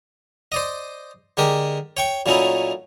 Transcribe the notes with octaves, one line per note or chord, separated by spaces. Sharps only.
C5 D5 D#5
D3 G#3 G4 A#4
C#5 G5 C#6
A#2 F#3 A3 C#4 D#4 E4